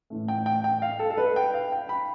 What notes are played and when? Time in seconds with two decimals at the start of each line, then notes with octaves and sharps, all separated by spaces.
0.10 A2 E3 A3
0.28 G5
0.46 G5
0.64 G5
0.82 F5
0.99 A4
1.10 A4
1.18 B4
1.36 G5
1.54 F5
1.72 G5
1.89 B5